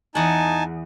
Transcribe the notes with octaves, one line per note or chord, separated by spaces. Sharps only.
E2 D#4 F#5 G#5 A5